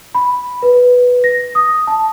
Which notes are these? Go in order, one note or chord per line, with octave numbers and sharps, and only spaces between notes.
B5
B4
A#6
D#6
A5